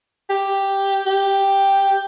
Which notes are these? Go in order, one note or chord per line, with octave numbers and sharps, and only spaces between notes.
G4
G4